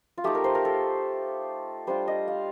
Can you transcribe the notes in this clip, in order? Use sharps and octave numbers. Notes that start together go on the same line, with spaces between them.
F4
A3 D#4 G4
A#4
C5
A#4
A4
G3 D4 F4 C5
D#5
F5